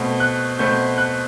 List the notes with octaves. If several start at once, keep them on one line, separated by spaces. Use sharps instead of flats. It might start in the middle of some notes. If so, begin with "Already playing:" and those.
Already playing: B2 A3 C4
F#6
B2 A3 C4 G6
F#6